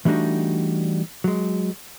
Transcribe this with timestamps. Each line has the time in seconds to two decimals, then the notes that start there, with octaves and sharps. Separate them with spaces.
0.05 E3 G3 A3 D4 D#4 F#4
1.24 F#3 G#3